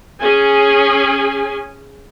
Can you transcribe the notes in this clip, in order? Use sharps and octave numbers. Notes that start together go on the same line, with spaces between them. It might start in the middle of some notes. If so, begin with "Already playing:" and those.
C#4 G#4 G#5